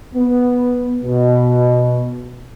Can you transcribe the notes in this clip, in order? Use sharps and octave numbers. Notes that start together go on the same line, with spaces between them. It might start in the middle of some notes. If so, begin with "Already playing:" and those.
B3
B2